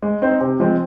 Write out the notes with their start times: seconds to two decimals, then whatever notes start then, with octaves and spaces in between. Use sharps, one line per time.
0.02 G#3
0.22 C4 D#4 C5
0.41 C3
0.60 F3 G#3 C4